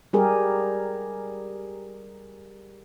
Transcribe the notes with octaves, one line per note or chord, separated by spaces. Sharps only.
G3 G4 G#4 A#4